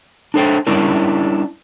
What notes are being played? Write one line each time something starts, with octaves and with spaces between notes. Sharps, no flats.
D4 A4 C5 G5
G3 C#4 D4 E4 A#4